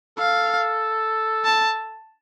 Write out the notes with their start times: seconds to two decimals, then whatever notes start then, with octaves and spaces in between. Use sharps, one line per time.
0.18 A4 F5
1.45 A5